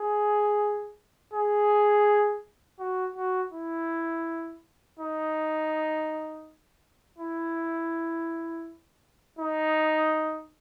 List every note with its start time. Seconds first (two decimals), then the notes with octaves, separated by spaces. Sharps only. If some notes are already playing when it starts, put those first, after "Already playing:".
Already playing: G#4
1.34 G#4
2.80 F#4
3.16 F#4
3.52 E4
4.99 D#4
7.18 E4
9.39 D#4